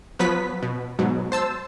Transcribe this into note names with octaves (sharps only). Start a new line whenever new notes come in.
F3 F#3 B3 B4 B6
B2
G#2 B2 F#3
C5 A5 E6